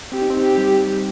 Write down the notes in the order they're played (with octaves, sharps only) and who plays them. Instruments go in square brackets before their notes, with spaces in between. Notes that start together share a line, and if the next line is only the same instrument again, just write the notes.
[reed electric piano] C4 [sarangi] G4
[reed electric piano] D#4
C4
[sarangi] G4
[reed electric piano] G3